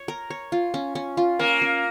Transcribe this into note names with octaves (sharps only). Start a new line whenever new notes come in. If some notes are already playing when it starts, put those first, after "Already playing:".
Already playing: C#5
A#4
C#5
F4
C#4
C#4
F4
A#3 C#4
C#4